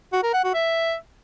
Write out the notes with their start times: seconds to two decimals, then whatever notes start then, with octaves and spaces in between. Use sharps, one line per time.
0.13 F#4
0.23 A#4
0.34 F#5
0.44 F#4
0.54 E5